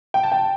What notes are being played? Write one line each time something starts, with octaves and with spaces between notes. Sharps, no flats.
G5
A5
G5